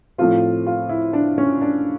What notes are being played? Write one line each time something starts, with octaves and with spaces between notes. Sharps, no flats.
A2 F3 A3 C4 F4
F4
E4
D4
C#4
D4